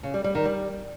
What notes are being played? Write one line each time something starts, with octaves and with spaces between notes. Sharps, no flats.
C#3
G3
G3
D#3
G3